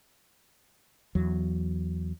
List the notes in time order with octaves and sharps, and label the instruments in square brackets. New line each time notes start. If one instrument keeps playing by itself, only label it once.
[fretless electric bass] E2 F#3